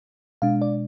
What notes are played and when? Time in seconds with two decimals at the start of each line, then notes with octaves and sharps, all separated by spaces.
0.42 B2 G#3 D4 F5
0.62 D5